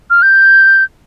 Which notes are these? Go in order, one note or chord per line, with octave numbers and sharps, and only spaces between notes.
F6
G6